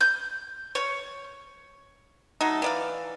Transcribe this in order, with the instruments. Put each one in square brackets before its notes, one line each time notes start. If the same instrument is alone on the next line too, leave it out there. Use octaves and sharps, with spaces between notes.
[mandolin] G6
C#5
[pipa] F#3 A3 D#4
E3 D5 F5